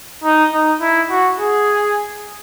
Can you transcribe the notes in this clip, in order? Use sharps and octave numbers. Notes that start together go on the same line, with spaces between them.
D#4
D#4
E4
F#4
G#4